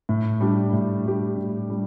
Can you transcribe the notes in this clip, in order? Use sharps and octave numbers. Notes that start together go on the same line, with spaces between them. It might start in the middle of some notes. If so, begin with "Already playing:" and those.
A2
G3 D4 G4
A2
G3 D4 G4
A2
G3 D4